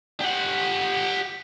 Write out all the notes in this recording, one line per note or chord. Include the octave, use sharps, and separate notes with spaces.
G4 F#5